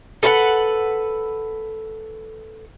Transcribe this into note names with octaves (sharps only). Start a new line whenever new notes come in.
A4 B4 F5 F#5